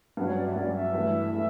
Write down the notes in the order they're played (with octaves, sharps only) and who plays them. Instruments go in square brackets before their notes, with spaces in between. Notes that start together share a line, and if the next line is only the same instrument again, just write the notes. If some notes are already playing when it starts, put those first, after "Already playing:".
[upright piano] G2 F#3 C#4 [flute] B4
[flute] C#5
D5
E5
[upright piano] G2 F#3 C#4 [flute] D5
[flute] E5
[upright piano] G2 E3 A3
E3 A3